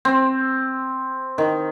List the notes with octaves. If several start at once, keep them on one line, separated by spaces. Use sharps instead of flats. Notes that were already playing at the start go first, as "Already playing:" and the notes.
C4
D#3